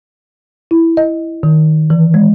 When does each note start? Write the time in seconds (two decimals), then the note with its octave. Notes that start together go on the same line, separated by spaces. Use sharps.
0.71 E4
0.97 D#5
1.43 D#3
1.90 E3
2.14 G#3